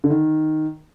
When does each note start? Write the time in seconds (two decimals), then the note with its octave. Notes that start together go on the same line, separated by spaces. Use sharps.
0.04 D3
0.10 D#3